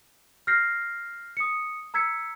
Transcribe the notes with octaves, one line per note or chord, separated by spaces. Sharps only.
F6 G6 A#6 C7
D#6 C#7
A#5 E6 G#6 B6 C#7